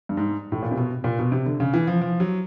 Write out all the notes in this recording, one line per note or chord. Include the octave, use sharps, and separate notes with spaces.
G2
G#2
A2
A#2
C3
B2
A#2
B2
C3
D3
C#3
E3
F3
F3
F#3